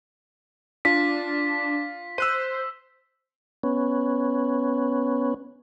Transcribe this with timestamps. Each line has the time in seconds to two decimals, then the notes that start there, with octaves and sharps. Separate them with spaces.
0.85 D4 F4 B6
2.18 C5 E6 F#6 D#7
3.63 B3 C#4